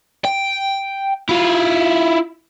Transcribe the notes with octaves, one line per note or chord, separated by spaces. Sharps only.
G5
E4 F4